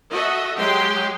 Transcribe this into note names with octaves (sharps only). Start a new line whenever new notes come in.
F#4 A4 D#5 E5
F#3 G#3 G4 G#4 G5 C6